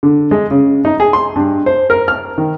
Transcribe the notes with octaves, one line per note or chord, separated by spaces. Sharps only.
D3
G#3
C#3
D#4
G#4
C6
G2
C5
A#4
F6
D#3